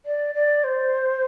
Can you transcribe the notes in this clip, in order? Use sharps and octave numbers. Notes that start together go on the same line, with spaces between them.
D5
D5
C5